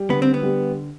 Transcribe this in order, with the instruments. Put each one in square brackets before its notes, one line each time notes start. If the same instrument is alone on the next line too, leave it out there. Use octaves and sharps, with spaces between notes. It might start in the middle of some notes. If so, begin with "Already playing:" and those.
Already playing: [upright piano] G3
[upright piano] D3 [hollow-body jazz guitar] B3
[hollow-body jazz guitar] C4
B3
[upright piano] G3